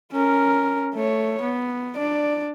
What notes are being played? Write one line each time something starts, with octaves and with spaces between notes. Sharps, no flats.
C#4 A#4
A3 C#5
B3
D4 D5